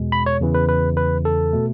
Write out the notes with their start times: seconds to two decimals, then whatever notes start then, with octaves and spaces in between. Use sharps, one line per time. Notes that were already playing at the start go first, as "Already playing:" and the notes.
Already playing: E2 B2 G#3
0.12 B5
0.26 C#5
0.41 E2 C#3 E3
0.54 B4
0.69 B4
0.97 B4
1.25 A4
1.53 B2 A3